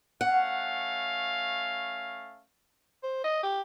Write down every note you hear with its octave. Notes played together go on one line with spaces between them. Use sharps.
A3 C#4 F5 F#5
C5
D#5
G4